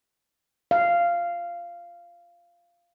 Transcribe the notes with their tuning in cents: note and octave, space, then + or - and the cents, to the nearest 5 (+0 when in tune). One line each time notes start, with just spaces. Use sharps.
F5 -10